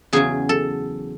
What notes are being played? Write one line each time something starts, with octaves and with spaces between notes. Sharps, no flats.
E2 C#3 F#3 G#4
A4